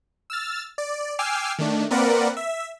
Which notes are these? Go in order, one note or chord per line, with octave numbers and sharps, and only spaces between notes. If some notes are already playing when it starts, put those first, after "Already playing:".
E6 F6 A6
D5
G5 G#5 D6 E6 F6 C7
D#3 A3 D4
A#3 C4 A#4 B4 D5 F#5
E5